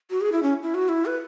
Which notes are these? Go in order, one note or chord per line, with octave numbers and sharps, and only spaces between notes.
F#4
G#4
E4
C#4
E4
F#4
E4
B4